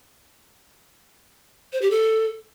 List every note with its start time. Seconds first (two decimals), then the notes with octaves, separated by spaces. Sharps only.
1.73 C5
1.82 G4
1.91 A4